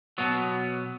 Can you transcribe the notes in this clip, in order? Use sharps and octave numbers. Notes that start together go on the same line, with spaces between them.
B2 F#3 B3